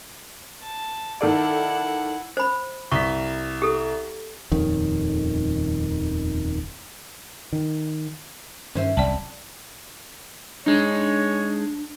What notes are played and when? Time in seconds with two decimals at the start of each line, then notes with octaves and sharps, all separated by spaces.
0.62 A5
1.21 D#3 E4 A4 D5 F#5
2.37 C5 B5
2.91 C2 C#6 B6
3.62 G4 A4
4.52 D#1 F2 D#3
7.53 D#3
8.75 G2 D#3 C#4 C5 E5
8.97 D#1 C2 D5 G5 A5
10.66 G#3 D4 D#4 C#5